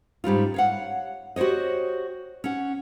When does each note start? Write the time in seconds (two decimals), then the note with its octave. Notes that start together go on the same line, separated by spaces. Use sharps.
0.24 G#2 G3 C#4 F4
0.54 C#5 F5 F#5
1.36 F#4 G4 C5 C#5 D#5
2.44 C#4 F#5